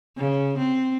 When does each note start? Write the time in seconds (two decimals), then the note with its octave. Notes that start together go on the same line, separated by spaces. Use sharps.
0.18 C#3
0.58 C4